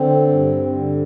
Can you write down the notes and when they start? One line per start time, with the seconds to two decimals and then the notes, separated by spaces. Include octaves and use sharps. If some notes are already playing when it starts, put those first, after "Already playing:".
Already playing: D3 C4
0.28 G2
0.76 D3